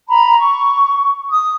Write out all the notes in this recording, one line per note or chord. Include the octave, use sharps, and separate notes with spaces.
A#5 B5
C#6
D#6